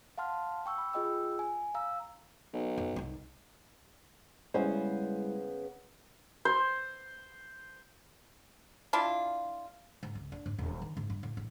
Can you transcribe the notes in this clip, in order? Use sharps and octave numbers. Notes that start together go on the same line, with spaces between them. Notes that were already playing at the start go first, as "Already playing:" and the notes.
F5 F#5 A5 C6 F6
G5 C#6 E6
B5
F4 G#4 D#5 G5 E6
G#5
F5 A#5 E6
B1
F#2
C2 D#4
C#3 G3 G#3 B3 C#4 E4 C5 G#5
C5
D4 E4 F4
G#2
C#2
D4
G#2
D#1
D#3
G#2
G2
A2
A1